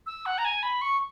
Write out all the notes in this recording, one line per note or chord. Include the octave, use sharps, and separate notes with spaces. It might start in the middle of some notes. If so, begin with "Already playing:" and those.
E6
F#5
A#5
G#5
B5
C#6